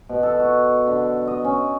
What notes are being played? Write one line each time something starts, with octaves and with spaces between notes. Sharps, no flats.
B2
A4
F#4
D3
D#5
C#4